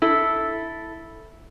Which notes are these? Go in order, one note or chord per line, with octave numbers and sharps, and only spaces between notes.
E4 A4